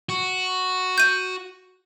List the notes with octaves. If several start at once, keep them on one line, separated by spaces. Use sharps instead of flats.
F#4
G6 D#7